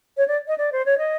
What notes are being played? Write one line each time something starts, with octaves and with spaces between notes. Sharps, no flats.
C#5
D5
D#5
D5
C5
C#5
D#5